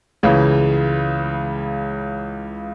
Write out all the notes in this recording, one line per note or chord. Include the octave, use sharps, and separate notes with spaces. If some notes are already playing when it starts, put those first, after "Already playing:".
C#2 C#3 E3